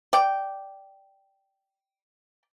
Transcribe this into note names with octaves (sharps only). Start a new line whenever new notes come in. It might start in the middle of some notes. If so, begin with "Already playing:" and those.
D5 G5